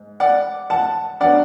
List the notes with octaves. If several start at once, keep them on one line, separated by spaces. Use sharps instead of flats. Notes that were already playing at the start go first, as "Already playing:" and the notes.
Already playing: G#2
D5 F#5
F#5 A5
F#3 B3 D4 D5 F#5